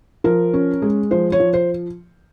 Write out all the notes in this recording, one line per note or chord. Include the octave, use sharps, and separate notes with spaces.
F3 A#4
C#4
G#3
F3 C5
C#5
F3
C5